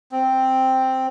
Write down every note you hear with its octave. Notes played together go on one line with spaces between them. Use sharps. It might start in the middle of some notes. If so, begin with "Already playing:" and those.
C4